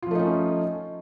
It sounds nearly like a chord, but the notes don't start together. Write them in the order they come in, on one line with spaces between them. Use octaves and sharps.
F4 F3 A3 D#4 C#4